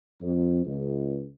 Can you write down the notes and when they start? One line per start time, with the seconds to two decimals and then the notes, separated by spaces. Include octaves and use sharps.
0.21 F2
0.66 C#2